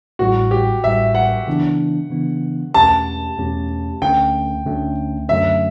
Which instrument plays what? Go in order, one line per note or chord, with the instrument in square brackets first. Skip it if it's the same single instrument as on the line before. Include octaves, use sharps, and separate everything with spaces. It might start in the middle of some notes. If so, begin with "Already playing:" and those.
[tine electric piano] A1 A2 G3 [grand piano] F#4
[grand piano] G4
[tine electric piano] A1 A2 G3 [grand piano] E5
[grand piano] F#5
[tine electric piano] C#3 E3 B3 D4
C#3 E3 B3 D4
[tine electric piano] E2 B2 A3 C#4 G4 [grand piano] A5
[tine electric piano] E2 B2 A3 C#4 G4
[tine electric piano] D2 D3 A3 C#4 [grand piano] G5
[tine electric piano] D2 D3 A3 C#4
[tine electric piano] F#2 D3 F#3 A3 C#4 [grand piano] E5